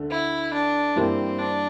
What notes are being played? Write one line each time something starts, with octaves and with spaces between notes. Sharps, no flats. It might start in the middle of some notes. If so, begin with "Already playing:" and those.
Already playing: D2 D3 A3
E4
D4
G2 E3 G3 A#3 C4 E4
D4